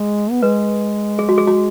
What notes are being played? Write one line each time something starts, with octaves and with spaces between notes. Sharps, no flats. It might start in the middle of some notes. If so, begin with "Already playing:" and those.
Already playing: G#3 G#4
B3
G#3 B4
G#4
F#4
G#4
F#4